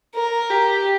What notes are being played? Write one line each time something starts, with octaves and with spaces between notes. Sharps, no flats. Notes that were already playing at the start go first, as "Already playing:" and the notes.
A#4
G4